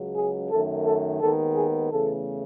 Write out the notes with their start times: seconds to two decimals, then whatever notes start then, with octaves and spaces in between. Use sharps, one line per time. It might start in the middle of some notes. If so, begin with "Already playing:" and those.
Already playing: C#2 C#3 F#3
0.16 G#4
0.51 F#2 D#3 A3 A4
0.86 A4
1.21 D#2 D#3 G#3 B3 A4
1.56 G#4
1.90 E2 C#3 E3 A3 A4